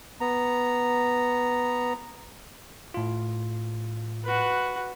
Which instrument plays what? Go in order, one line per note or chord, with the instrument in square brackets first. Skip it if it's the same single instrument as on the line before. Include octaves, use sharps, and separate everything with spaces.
[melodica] B3 A#5
[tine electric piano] A2 F4
[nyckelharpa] F#4 B4